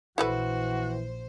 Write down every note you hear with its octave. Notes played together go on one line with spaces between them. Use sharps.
A#1 E3 E4 F#4 A4 B4 C5